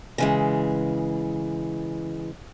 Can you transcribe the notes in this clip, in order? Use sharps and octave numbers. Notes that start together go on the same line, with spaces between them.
C#3 E3 G#3